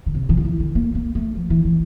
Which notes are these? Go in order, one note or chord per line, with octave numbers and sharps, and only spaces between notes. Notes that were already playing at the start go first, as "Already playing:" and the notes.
D3
C3
E3
F3
E3
D3
A#3
A#3
A3
F3
E3
E3